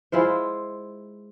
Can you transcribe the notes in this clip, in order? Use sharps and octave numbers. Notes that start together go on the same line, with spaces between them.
G#3 E4 F4 C5